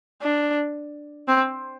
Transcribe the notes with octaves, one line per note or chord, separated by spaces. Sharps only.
D4
C4